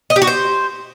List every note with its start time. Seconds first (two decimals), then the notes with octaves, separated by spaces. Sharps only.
0.10 D#5
0.16 G4
0.22 F#4
0.27 C5